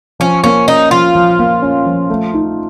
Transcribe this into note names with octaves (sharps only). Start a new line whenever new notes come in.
F3 C#4
A#3 C#4
C#4 D#4
F3 F4
F3
A#3
C#4
F3
A3
D#4